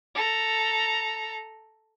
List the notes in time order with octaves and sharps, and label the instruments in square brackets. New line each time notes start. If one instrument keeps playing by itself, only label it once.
[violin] A4 A#5